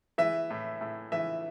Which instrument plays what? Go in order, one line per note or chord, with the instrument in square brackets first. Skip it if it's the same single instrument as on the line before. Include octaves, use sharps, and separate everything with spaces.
[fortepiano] E3 E5
A2
A2
E3 E5